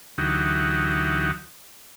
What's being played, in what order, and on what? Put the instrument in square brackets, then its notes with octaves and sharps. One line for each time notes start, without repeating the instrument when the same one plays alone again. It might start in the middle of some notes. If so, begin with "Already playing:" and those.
[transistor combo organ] D2 E3 F#3 D#4 F#4 G4